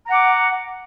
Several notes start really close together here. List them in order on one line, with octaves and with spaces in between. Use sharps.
A#5 F#5 D6